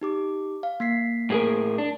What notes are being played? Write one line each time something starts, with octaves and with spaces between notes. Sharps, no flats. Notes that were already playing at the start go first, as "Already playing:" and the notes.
D#4 G4 D6
F5
A#3 B6 C7
A2 G#4 A#4
D4